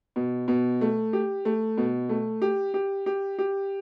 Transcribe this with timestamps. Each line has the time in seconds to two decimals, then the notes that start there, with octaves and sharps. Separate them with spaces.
0.16 B2
0.48 B2
0.81 A3
1.13 G4
1.45 A3
1.78 B2
2.09 A3
2.42 G4
2.74 G4
3.06 G4
3.39 G4